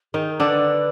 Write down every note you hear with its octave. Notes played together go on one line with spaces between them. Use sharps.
D#3 D#4 G#4
A#4
D3 D4
B4